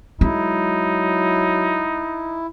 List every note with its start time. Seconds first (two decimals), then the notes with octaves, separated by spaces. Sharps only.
0.21 F#3 G#3 D#4 E4